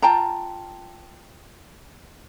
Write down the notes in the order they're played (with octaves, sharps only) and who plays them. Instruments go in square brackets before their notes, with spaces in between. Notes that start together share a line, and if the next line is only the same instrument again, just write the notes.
[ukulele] F4 G5 A5 A#5